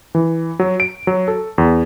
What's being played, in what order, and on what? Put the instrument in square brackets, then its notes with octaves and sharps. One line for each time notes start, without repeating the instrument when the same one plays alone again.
[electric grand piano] E3
F#3
D7
F#3
A4
E2